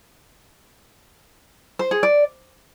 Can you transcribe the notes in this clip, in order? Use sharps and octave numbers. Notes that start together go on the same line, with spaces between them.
C5
G#4
D5